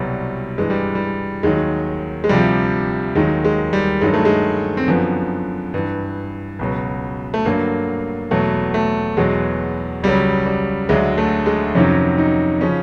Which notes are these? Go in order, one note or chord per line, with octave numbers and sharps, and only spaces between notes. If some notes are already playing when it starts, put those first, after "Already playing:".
Already playing: C2 B2 F#3 G3
G2 E3 G#3
G3
G3
D#2 D#3 F#3 G#3
G#3
D2 C3 F3 G3
D#2 D#3 F#3 G#3
G#3
G3
G2 D#3 F#3 G#3
A3
G#3
C4
F#2 D3 F3 B3
G2 E3
C#2 B2 F#3
A3
G2 D3 F#3 A#3
E2 B2 F#3 A3
A3
E2 B2 F#3 G#3
C#2 C#3 F#3 G3
G3
D2 D3 F#3 G#3
A3
G#3
F2 C3 D#3 F#3 C#4
D#4
C#3 F3 C#4